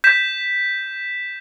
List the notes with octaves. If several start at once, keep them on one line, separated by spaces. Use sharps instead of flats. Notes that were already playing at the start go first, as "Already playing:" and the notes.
G6 B6 E7